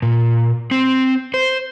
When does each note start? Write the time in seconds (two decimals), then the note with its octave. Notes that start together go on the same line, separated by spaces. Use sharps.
0.02 A#2
0.71 C4
1.34 C5